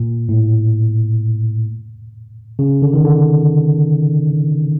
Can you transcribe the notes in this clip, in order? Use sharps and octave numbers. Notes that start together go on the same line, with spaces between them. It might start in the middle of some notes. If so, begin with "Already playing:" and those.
Already playing: A#2
A2
C#3
D3
D#3
D3